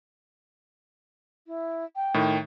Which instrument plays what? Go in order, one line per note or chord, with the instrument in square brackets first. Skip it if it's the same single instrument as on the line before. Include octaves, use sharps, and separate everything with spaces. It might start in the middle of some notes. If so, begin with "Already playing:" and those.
[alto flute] E4
G5
[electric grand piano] A2 D#3